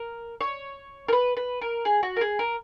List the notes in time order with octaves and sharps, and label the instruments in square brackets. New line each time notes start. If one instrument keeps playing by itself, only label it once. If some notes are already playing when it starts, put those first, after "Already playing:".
Already playing: [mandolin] A#4
C#5
A#4
B4
B4
A#4
G#4
F#4
A#4
G#4
A#4